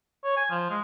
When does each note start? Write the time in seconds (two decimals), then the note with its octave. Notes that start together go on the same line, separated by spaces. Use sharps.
0.24 C#5
0.37 G#5
0.50 F3
0.70 G#3